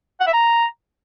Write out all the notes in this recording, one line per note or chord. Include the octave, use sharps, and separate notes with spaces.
F#5
E5
A#5